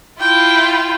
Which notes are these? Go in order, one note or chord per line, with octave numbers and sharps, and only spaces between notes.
E4 F4 G5